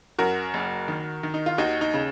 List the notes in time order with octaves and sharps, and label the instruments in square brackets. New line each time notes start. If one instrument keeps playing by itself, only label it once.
[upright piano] F#2 F#4 A#4
F#1
D#3
D#3
D#4
F4
D#2 D#4 F#4
D#4
C#3